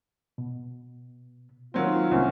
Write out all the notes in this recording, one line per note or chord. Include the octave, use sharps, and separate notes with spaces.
B2
D#3 F#3 A#3 C4 F4
C2 A#3 C#4 C5 F#5